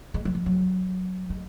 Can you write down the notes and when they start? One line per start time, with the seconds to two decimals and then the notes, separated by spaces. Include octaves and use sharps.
0.14 G#3
0.25 F#3
0.35 F3
0.46 F#3
1.30 G#3